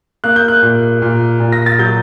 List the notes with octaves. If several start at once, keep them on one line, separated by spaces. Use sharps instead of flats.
A#3 F#6
G6
F#6
A#2
A#2
A#2
A#6
A6
F#3 G6